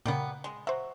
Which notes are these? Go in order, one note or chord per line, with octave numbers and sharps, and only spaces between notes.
A#2 C#3 G3 A#3 B3
G#3
F#3 C5 E5